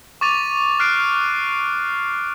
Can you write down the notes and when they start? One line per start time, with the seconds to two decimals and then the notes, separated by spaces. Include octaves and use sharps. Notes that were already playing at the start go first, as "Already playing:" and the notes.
0.21 C#6 D6 A6 D#7 F7
0.80 F6 F#6 C7 D7